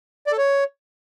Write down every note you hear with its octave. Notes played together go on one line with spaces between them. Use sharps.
D5
A4
C#5